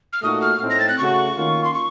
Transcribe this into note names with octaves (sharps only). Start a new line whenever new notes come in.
F6
A#2 A3 D#4 F#4 D#6
F6
A2 A3 C4 D#4
A#6
A6
F#6
C#3 A3 C#4 F#4 C#6
D#3 A#3 C#4 F4
C6
C#6